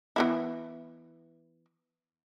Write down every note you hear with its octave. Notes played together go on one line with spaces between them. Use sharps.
E3 B3 E4